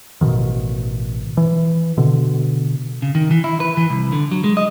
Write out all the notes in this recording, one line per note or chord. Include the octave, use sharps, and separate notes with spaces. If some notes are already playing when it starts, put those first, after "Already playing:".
A1 B2 D3 D#3
E3
B2 D3
C#3
D#3
E3
E4
B4
E3
C2
D3
F#3
G#3
D#5